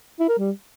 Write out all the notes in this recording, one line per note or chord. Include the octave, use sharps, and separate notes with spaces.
E4
A#4
G3